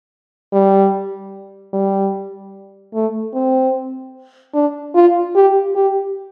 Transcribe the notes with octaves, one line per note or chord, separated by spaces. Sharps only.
G3
G3
A3
C4
D4
F4
G4
G4